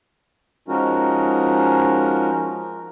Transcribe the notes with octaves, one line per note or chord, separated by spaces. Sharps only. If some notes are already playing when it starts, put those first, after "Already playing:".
F3 G#3 C#4 D#4 F#4 A#4